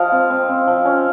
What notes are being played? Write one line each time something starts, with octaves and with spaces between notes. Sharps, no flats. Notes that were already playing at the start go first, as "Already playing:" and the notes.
Already playing: F3 D#5 F5
C4
C4
C4
F3
C#4